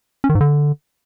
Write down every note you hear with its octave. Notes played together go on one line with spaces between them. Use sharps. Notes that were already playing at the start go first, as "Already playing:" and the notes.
C#4
D#3
G#2
D3